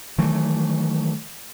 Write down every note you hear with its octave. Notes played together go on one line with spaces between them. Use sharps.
D#3 E3 F#3 A3